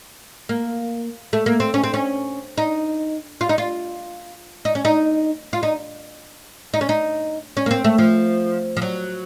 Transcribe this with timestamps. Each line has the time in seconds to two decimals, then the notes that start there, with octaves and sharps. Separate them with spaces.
0.49 A#3
1.33 A3
1.46 A#3
1.60 C4
1.74 C#4
1.84 C4
1.94 C#4
2.58 D#4
3.41 F4
3.49 D#4
3.58 F4
4.65 D#4
4.75 C#4
4.85 D#4
5.53 F4
5.63 D#4
6.74 D#4
6.81 C#4
6.89 D#4
7.57 C#4
7.66 A#3
7.71 C4
7.84 A3
7.98 F3
8.77 F3
8.82 F#3